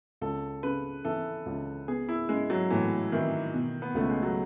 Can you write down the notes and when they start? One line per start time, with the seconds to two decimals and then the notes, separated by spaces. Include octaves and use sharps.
0.21 C#2 A4
0.63 C#3 B4
1.05 E3 A4
1.46 C#2
1.88 B3 G#4
2.09 E4
2.29 C#3 G#3
2.50 F#3
2.70 A2 E3
3.12 D#3 E3
3.54 B2
3.82 B3
3.95 C#2 A3
4.10 G#3
4.22 F#3